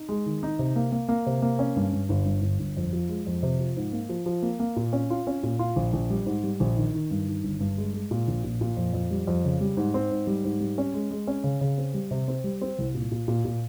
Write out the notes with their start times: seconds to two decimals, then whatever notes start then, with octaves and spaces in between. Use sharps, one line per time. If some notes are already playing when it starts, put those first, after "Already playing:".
Already playing: D#4
0.09 G#3
0.26 D#3
0.43 D#4
0.59 C3
0.76 A#3
0.92 A#3
1.09 A#3
1.26 C3
1.42 A#3
1.59 C#4
1.76 G2
1.93 G2
2.09 G1
2.25 G2
2.42 G1
2.59 G1
2.77 F2
2.93 F3
3.09 G#3
3.27 F2
3.43 C3
3.59 F3
3.76 G#2
3.92 A#3
4.09 F3
4.26 F3
4.42 A#3
4.60 A#3
4.76 A#2
4.93 C#4
5.10 F4
5.27 C#4
5.43 A#2
5.59 F4
5.76 A#1
5.93 A#1
6.10 G3
6.26 G#2
6.43 G3
6.60 A#1
6.77 D#3
6.94 D#3
7.11 G2
7.27 D#3
7.44 G1
7.60 G2
7.77 G#3
7.94 G#3
8.11 A#2
8.28 A#1
8.44 A#2
8.61 A#2
8.77 F2
8.94 F2
9.11 G3
9.27 F2
9.44 C#3
9.61 G3
9.77 G#2
9.94 C4
10.11 G#2
10.27 G3
10.44 G#2
10.60 G3
10.78 C#4
10.94 G#3
11.10 G#3
11.27 C#4
11.44 C#3
11.61 C#3
11.78 C4
11.94 G3
12.11 C3
12.28 C4
12.44 G3
12.61 C4
12.78 C2
12.95 A#2
13.11 A#2
13.28 A#2
13.45 A#2